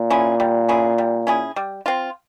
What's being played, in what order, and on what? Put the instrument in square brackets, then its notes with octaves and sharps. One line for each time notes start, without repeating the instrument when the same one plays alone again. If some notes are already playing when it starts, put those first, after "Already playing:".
Already playing: [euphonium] A#2
[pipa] C#4 E4 G#4
G3
C#4 E4 G#4
G3
C#4 E4 G#4
G3
C4 F4